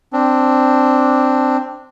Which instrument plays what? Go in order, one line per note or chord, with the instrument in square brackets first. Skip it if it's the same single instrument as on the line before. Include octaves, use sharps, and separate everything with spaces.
[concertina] C4 D4